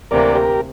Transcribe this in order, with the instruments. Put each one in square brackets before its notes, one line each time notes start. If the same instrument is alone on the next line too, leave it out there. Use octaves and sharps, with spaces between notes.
[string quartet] D2 C3 E3 A#3 [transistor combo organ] A#4 D5
[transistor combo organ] G4 A#4